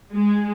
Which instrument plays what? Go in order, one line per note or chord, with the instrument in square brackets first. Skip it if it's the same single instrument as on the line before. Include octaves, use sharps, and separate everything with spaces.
[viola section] G#3